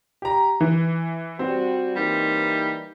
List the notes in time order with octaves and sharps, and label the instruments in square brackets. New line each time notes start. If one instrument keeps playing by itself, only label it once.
[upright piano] G4 A#5
E3
[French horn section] G3 F#4 [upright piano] C4
[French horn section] E3 A#3 D#4 [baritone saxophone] G3